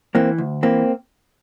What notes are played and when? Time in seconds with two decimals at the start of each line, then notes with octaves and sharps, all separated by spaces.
0.15 E3 A#3 C4
0.38 D2
0.63 E3 A#3 C4